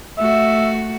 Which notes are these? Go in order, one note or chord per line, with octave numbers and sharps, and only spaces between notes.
A3 F#4 E5